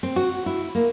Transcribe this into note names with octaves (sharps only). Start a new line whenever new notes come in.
C4
F#4
E4
A#3